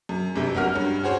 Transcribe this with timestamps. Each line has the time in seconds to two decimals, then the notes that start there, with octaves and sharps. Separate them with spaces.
0.09 F#2
0.36 G1 C3
0.55 G1 F#3 F#4 A#4 F6
0.74 G2 C#4
1.04 F#4 G#4 C5 C#5